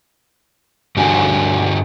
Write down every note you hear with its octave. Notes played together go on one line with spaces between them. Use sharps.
G2 D3 D4 F#4 G4 G#5